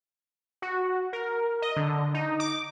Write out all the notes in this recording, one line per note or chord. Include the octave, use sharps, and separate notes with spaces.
F#4
A#4
D#5
D3
D#4
D6